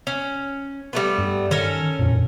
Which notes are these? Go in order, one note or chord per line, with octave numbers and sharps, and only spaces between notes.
C#4
G3 A3 B3
G2
D#3 C#4 A4 A#4
D#1 F2 A#2